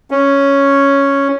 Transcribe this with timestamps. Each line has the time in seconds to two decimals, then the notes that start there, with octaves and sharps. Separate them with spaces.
0.11 C#4